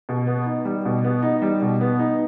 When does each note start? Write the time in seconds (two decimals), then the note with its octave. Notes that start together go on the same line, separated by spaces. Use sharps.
0.09 B2
0.27 B3
0.46 D#4
0.65 G3
0.85 B2
1.04 B3
1.22 D#4
1.42 G3
1.62 B2
1.81 B3
1.99 D#4